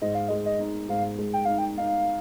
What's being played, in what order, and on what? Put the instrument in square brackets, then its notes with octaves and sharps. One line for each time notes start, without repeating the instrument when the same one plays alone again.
[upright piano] G#2 [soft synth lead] D#5
[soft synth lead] F5
[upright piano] G#3 [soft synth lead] D#5
[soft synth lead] D#5
[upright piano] D#4
[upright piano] G#2 [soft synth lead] F5
[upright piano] G#3
[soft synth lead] G5
[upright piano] D#4 [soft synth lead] F5
[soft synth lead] G5
[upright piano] D#4 [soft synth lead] F5